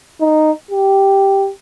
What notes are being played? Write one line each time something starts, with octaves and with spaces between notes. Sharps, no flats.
D#4
G4